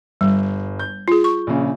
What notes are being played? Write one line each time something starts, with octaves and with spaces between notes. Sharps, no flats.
G1 G3
G6
F4 G#4
C#6
A#1 C#3